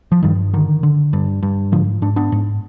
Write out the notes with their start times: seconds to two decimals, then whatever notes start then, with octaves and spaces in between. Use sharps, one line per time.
0.12 F3
0.23 G2 D#3 G3
0.53 D3 D#3
0.83 D3
1.13 G2
1.43 G2
1.72 G#2 D3 F3
2.02 G#2 D4
2.16 B3 D4
2.32 G#2